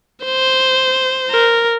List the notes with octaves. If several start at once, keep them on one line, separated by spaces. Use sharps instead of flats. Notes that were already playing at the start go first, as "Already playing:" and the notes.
C5
A#4